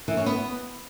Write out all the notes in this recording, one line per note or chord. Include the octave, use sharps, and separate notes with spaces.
E3
C#4
B3